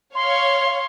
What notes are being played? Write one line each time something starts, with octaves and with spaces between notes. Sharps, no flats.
C#5 F5 C6